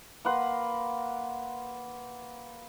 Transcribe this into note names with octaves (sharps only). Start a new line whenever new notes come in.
A#3 B4 F#5 C6